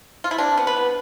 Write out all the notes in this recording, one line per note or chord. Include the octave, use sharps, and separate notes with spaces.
F4
E4
C3 D4
B3
B4
B3